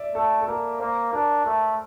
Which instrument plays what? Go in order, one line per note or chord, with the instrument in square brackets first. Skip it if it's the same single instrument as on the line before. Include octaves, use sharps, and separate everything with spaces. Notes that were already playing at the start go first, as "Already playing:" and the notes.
Already playing: [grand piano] D5 E5
[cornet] A3 [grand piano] A4
[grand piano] A4
[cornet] A#3 [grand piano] A#4
[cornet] A#3 [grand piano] C5
[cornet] D4 [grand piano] A#4
[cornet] A3 [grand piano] A4